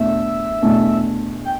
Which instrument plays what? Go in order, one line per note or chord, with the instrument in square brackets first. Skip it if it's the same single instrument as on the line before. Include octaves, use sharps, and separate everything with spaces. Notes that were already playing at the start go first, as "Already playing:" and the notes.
Already playing: [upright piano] E2 B2 A3 D4 [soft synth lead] E5
[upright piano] E2 B2 A3 D4
[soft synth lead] G5